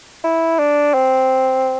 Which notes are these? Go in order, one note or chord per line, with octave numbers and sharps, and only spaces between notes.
E4
D4
C4